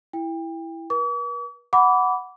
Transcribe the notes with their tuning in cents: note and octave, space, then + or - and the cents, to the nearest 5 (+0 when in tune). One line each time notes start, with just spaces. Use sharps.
E4 +0 G5 +30
B4 -45 D6 -45
F#5 +0 B5 +0 D6 -25